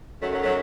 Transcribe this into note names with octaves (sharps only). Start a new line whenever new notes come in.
F#2 D#3 F#3 A3
F#3 A3
F#3 A3